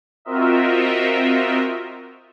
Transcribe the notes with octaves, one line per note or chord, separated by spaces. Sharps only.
C4 F4 F#4 A#4 D#5 E5